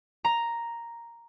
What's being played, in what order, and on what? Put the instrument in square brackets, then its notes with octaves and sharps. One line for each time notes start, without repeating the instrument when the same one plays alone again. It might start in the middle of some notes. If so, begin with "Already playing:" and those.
[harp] A#5